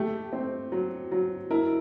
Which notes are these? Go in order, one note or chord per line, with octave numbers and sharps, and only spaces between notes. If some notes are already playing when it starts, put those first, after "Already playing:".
Already playing: A3 G4
C4
F#3
F#3
E4 A#4